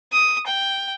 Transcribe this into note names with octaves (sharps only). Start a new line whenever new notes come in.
D#6
G5